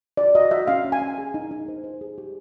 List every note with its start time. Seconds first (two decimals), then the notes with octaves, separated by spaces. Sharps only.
0.17 F#4 D5
0.35 F#4 D#5
0.51 F#4 E5
0.67 C#4 F5
0.85 C#4
0.92 G#5
1.02 C#4
1.18 G#4
1.34 D#4
1.51 D#4
1.68 C5
1.84 C5
2.01 G#4
2.18 G4